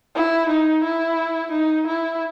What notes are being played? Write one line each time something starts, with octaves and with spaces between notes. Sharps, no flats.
E4
D#4
E4
D#4
E4